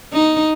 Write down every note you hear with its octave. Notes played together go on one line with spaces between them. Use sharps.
D#4